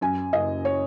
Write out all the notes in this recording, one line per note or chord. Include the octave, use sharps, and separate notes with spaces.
F#2 G#5
F#1 D#5
C#5